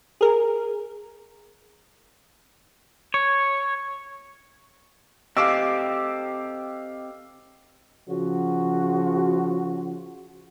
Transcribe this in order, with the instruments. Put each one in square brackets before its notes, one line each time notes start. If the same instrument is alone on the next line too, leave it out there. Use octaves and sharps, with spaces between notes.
[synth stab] G#4 A#4
[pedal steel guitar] C#5
[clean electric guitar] C4 G4 A4 [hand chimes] D#5 [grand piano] F5 D6 E6
[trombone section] C#3 F3 F#4